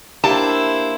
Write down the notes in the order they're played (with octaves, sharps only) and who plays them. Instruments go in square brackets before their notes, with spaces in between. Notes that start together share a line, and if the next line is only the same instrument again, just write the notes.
[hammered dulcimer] A#3 E5 [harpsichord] D4 G4 [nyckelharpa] E4 C5 [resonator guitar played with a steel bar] A5